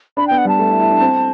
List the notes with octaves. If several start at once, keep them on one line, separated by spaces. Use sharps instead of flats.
D4 B5
B3 G5
F#5
G3 A5
A3
E4
E4
D4
C4